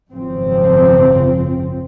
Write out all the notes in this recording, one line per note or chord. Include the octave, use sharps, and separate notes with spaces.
G#1 F#2 C#3 F3 C4